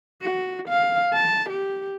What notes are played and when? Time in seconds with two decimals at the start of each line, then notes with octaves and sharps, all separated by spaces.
0.22 F#4
0.69 F5
1.13 A5
1.50 G4